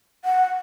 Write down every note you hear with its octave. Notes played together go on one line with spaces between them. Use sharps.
F#5